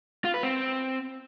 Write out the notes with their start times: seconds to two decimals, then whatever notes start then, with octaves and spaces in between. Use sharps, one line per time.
0.25 F4
0.34 B4
0.43 C4